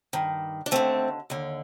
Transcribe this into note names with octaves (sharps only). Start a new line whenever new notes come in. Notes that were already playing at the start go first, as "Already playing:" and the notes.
G2 D#3
D4
D#2 D3 A3 C4
D#2 D3